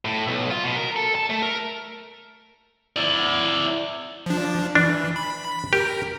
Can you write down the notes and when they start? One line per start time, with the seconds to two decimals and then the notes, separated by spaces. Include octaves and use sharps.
0.05 A2
0.27 B1
0.50 F4
0.64 B2
0.76 A#4
0.96 A4
1.15 A5
1.30 A3
1.42 A#4
2.96 E4 D5
4.26 F3 D4
4.75 E3 D4
5.16 B5
5.73 G4 A#4